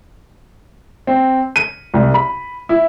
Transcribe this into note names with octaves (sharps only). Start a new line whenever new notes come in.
C4
D#7
C2
B5
E4